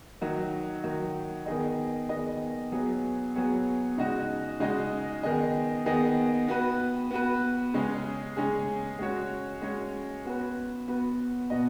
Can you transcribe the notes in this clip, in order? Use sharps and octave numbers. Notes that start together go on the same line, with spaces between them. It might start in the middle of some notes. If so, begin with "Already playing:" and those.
D#3 F#3 D#4
D#3 F#3 D#4
D#3 B3 G#4 D#5
D#3 B3 G#4 D#5
F#3 B3 G#4 C#5
F#3 B3 G#4 C#5
C#3 G#3 D#4 F#4 D#5
C#3 G#3 D#4 F#4 D#5
D#3 B3 G#4 D#5
D#3 B3 G#4 D#5
B3 F#4 B4
B3 F#4 B4
C#3 G#3 C#4 G#4
C#3 G#3 C#4 G#4
G#3 C#4 F#4 C#5
G#3 C#4 F#4 C#5
B3 F#4 B4
B3 F#4 B4
B2 B3 F#4 D#5